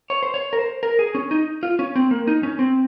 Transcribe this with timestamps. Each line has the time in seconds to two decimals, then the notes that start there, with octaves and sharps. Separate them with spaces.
0.10 C#5
0.23 C5
0.34 C#5
0.53 A#4
0.59 C5
0.83 A#4
0.99 G#4
1.15 C#4
1.31 D#4
1.63 F4
1.79 C#4
1.96 C4
2.11 A#3
2.27 D#4
2.43 C#4
2.59 C4